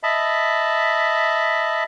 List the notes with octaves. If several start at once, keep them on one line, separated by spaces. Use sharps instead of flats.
D#5 E5 A5 B5